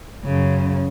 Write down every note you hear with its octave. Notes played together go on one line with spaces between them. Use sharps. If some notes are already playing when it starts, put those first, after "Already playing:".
F#2 C#3